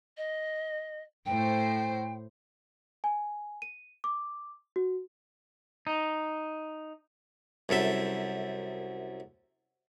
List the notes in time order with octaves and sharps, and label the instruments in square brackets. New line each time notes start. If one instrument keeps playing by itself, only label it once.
[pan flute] D#5
[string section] A2 C5 [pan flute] G5
[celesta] G#5
D#7
D6
F#4
[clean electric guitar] D#4
[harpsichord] C2 F#2 A4 E5